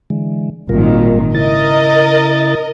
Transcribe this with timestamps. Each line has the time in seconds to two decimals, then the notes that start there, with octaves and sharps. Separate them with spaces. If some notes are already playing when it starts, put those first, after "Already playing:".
0.10 D3 E3 G#3
0.69 G#1 A#2 D#3 G3 F4 A#4
1.35 C#3 E4 A#4 D#5 A6